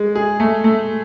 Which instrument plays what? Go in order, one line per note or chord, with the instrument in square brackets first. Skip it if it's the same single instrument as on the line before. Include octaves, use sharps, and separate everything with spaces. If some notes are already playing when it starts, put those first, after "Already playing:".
Already playing: [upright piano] G#3
G#4
A3
A3